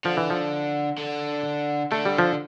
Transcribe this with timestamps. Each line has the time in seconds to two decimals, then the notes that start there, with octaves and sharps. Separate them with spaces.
0.04 D3 F3
0.17 E3
0.30 F3
0.98 D3
1.92 D3 A3
2.05 G3
2.18 F3